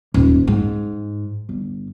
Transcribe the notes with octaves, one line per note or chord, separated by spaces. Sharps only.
D#1 G#2
G#2
G1